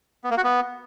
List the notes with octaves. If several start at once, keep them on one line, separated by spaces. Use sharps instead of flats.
B3
A#3
F#4
B3